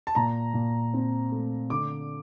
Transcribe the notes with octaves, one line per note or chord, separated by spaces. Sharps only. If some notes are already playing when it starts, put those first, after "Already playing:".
A5
A#2 A#5
A#2
C4
A3
D3 D6